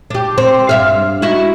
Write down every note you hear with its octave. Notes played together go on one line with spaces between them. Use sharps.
D4 G4
C4
G2 E5 F5
D#4 E4 F#4